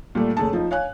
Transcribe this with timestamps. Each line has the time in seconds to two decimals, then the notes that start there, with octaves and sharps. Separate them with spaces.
0.15 A#2 G3 A3
0.37 F#1 A3 G#4 A5
0.53 F3 D#4
0.71 C#5 F5 G#5 F#6